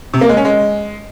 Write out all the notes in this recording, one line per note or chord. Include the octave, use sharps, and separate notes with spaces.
C3
A#3
G#3
C#4
G#3